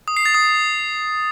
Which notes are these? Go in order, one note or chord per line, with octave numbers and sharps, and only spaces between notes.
D#6
C7
A6
D#6